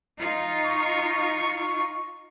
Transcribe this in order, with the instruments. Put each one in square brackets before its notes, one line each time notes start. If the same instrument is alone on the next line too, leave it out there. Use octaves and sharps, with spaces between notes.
[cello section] D#4 F4
[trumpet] C#6